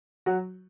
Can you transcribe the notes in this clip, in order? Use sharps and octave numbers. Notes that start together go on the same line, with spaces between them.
F#3 F#4